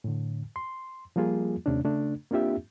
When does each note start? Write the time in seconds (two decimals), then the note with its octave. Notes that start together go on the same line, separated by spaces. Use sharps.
0.04 A2 D3
0.56 C6
1.16 F3 G3 A#3 F4 G#4
1.66 D#2 C3 A3 C#4 D4
1.85 C#3 A3 D4
2.31 A#3 C4 D4 F4 G4 E5